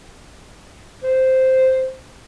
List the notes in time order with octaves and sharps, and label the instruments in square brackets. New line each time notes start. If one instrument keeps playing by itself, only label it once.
[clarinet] C5